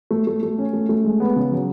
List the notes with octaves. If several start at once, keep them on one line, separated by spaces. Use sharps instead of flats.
A3
A3
A3
C#4
A3
A3
G#3
B3
C#3
F#3